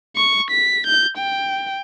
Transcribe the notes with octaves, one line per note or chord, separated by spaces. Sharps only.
C#6
B6
G6
G5